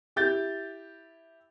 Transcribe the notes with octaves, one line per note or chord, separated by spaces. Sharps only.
E4 G4 G6 A6